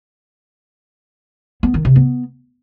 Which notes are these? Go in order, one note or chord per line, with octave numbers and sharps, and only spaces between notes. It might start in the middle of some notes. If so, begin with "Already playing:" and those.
B3
D#3
C3
B3